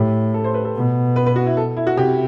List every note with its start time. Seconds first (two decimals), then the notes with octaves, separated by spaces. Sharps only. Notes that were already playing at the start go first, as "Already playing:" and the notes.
Already playing: A2 G4
0.34 A4
0.44 C5
0.54 B4
0.65 A4
0.75 B2
1.16 B4
1.26 B4
1.36 F#4
1.46 E4
1.57 A4
1.77 E4
1.87 F#4
1.97 C3 G4